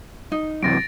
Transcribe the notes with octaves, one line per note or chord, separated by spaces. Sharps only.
D#4
F#2 C3 E3 A6 A#6 D7